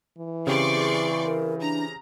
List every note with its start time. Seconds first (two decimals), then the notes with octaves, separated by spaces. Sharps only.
0.18 E3
0.47 C#3 C4 G4 G#4 D5 C6 C#6
1.25 A#4
1.61 D4 A#5